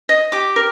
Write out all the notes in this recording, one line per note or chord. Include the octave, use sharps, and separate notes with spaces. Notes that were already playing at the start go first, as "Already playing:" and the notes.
D#5
G4 D6
A#4